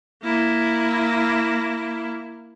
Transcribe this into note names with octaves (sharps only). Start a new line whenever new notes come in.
A#3 E4